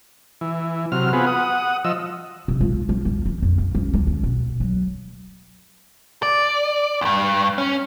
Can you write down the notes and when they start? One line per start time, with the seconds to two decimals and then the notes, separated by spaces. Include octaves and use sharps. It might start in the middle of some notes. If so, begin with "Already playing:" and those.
0.41 E3
0.92 C3 F#3 F6
1.13 B3 C4 F4 G#4 B4 F#5
1.27 F#5 D#6
1.84 F3 D#5 E6
2.48 C3
2.61 F4
2.89 C#3
3.05 E2
3.26 E3
3.42 F2
3.58 C#3
3.75 C#4
3.94 D2
4.07 C#2
4.23 B2
4.60 F#3
6.23 D5
7.01 D2 G2
7.58 C#4